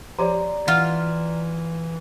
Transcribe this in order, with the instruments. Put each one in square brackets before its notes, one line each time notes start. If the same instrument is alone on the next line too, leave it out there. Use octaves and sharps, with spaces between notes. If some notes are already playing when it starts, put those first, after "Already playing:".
[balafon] F3 G4 C#5 [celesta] D5 A#5
[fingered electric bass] E3 [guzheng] F4 [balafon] F#5